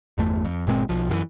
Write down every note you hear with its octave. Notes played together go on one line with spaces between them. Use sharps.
G1 E2 A3
F2
G1 A#2 G#3 C4
B1 F3
F#2 D#3 E3